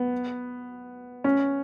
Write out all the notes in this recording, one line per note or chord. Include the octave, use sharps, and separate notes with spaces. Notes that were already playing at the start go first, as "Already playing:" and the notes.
Already playing: B3
C#4